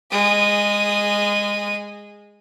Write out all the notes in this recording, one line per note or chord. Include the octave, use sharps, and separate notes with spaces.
G#3 D#6